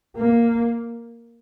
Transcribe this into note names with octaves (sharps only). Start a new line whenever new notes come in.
A#3